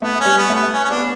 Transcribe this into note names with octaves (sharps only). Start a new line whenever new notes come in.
A3 B3
C#4
G3
B3
A3
B3
C#4
C#4
B3 D4